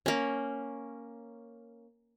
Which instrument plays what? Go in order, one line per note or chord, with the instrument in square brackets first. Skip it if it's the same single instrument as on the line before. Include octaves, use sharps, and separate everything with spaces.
[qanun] A#3 C#4